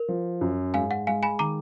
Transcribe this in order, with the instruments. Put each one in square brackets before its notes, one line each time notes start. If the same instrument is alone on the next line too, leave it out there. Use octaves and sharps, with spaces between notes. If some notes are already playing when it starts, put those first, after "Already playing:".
Already playing: [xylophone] A#4
[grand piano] F3
F#2
[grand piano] G#2 [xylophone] F5 G#5
[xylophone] F#5
[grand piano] G#3 [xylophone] F5 G#5
[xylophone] G#5 B5
[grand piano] D#3 [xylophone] A#5 D6